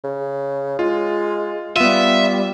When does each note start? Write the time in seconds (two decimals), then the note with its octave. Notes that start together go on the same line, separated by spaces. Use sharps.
0.04 C#3
0.79 G#3 F4
1.76 G3 B3 F4 E5 D#7